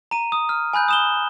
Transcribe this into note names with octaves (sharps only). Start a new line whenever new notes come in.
A#5 D#7
D#6
F6
G#5 B5 F#6 G6
D#6 E7 G7